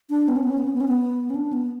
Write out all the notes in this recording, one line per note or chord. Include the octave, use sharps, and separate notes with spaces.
D4
B3
C#4
B3
C#4
B3
C#4
B3
C#4
B3
C#4
D4
B3